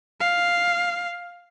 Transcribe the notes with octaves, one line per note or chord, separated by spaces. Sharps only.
F5